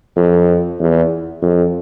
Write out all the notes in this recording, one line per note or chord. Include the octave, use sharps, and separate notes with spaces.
F2
E2
F2